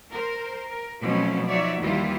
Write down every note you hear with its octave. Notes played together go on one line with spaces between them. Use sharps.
A#4 C5
A#4
B2 F3 F#3 A3 C4 C#4
F3 D#4 F#4 C#5 D5 E5
D#2 E3 G3 E4 F4